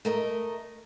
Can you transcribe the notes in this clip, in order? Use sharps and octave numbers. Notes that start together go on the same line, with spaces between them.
A3 A#4 D#5